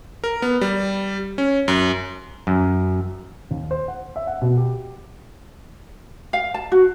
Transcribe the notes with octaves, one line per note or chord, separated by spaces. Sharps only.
A#4
B3
G3
C#4
F#2
F#2
D#2
C5
F#5
E5
F#5
B2
G4
F5
A5
F#4